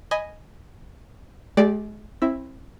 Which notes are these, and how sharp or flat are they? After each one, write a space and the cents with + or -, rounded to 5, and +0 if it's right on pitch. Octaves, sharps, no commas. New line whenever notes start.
D#5 +0 G#5 +0 B5 +0
G#3 +35 G4 -10 D5 +0
C4 +30 E4 +0